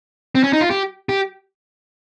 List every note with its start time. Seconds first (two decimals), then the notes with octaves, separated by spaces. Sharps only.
0.35 C4
0.44 C#4
0.53 D#4
0.61 F4
0.70 G4
1.09 G4